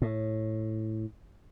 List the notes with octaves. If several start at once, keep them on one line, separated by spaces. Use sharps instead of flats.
A2